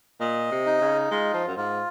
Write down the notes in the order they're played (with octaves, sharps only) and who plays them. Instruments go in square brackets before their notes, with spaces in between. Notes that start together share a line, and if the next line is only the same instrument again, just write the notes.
[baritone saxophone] A#2 [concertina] D#5
[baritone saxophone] C3
[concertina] D#4
[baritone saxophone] C#3
[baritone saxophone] G#3 [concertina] F4
[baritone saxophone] F3
F#2
[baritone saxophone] G#2 [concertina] F4